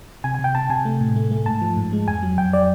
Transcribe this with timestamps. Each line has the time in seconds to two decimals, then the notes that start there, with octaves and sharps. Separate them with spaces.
0.24 C3 G#5
0.34 G#5
0.39 C3
0.44 G5
0.55 C3 A5
0.70 C3 G#5
0.85 A3
1.01 A2
1.16 A3
1.31 A3
1.46 G#2 A5
1.62 F3
1.77 G#2
1.92 G#3
2.08 F2 G#5
2.23 F#3
2.38 F2 G5
2.53 F#3 D5